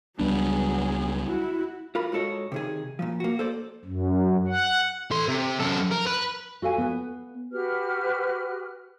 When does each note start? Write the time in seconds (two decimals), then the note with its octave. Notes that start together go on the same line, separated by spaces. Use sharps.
0.20 C#2 F#3 G3 B3 D4 G#4
1.24 E4 F#4
1.95 F4 A#4 B5
2.12 G#2 F#4 A4 C#5 D#5
2.52 C3 D#3 G#4
2.99 A#2 C#3 F3
3.20 A#3 F#4
3.39 A4 C5 D5
3.85 F#2
4.48 F#5
5.11 A4 C6
5.28 C3
5.60 F#2 A4
5.91 A#4
6.06 B4
6.62 F#4 A4 F5 G#5
6.78 B3 B4
7.51 F#4 G4 B4 F6